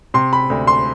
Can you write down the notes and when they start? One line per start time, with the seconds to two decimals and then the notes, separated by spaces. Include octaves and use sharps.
0.14 C3 C6
0.33 B5
0.50 D2
0.67 C6